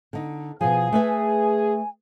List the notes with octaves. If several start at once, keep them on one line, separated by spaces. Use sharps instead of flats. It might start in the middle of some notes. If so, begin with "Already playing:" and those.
D3 D#4
B2 F3 G#4 G#5
A3 B4 E5